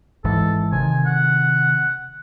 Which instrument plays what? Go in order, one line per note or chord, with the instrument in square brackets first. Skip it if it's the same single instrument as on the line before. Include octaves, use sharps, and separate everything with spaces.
[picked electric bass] G#1 G#2 E3 [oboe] A4
[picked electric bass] C3 D#3 [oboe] G#5
[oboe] F#5